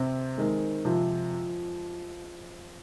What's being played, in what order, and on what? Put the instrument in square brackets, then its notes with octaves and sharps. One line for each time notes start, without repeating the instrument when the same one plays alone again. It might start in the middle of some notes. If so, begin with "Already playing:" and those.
Already playing: [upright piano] C3 [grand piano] C4
[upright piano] D#3 [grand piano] G#3
[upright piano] C3 [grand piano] F3